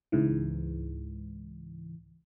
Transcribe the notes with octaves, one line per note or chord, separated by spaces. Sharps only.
C#2 G#2 E3